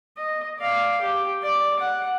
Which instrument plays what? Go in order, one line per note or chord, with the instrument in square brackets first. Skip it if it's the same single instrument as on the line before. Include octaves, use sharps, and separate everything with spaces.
[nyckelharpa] D#5
D5 F5
G4
D5
F#5